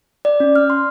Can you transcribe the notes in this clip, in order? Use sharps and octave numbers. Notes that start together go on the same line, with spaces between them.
D5
C#4
F6
C6